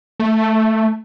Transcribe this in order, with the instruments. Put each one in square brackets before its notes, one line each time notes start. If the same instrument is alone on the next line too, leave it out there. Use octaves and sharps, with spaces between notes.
[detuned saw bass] A3